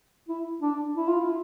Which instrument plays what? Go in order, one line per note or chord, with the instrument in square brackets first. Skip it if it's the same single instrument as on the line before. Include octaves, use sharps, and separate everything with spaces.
[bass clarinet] E4
D4
E4
F4
E4